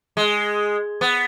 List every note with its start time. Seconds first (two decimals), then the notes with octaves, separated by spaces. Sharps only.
0.17 G#3
1.01 B3